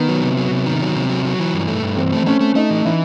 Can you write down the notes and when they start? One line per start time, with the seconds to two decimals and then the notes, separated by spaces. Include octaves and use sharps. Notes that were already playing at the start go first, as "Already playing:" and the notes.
Already playing: D#3 B3
0.09 F#3
0.23 C3
0.37 F#3
0.51 C3
0.66 D#3
0.81 F#3
0.96 C3
1.10 F#3
1.25 F#3
1.39 E3
1.54 G2
1.68 A3
1.83 G2
1.97 E3 C4
2.13 A3
2.26 A3 C#4
2.41 A3
2.55 A3 D#4
2.70 E3
2.85 E3 E4